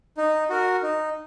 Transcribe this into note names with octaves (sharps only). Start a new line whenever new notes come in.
D#4
F#4 A#4
D#4